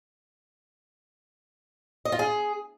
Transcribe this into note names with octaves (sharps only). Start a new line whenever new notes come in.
D#5
F4
G#4